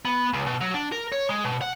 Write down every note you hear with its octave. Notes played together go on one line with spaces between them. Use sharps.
B3
C#2
B2
F#3
D4
A#4
C#5
G#3
B2
F#5